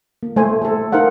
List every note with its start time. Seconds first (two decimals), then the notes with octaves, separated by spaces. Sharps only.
0.23 A#3
0.36 A3 C5 G#5
0.62 A3 A4
0.92 D#4 A#4 C5 F5 F#5